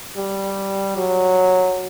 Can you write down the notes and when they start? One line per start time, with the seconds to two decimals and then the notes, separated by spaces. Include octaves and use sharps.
0.17 G3
0.97 F#3